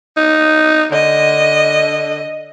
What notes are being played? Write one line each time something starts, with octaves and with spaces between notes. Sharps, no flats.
D#4
D3 D#5